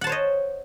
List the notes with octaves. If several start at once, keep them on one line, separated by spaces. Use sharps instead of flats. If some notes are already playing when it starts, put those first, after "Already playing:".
C5 C#5 D#5 F#5 A5